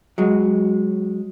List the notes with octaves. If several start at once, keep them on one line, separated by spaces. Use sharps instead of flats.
F#3 G#3